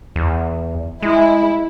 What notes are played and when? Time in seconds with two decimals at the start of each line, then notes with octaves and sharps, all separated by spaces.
0.16 E2
1.02 G#3 E4